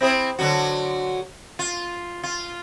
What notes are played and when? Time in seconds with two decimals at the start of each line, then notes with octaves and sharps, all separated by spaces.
0.01 C4 E4 G#4
0.39 D3 F#3 F#4
1.59 F4
2.23 F4